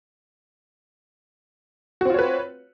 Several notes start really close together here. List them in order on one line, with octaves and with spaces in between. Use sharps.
F#4 C4 F4 C#5 B4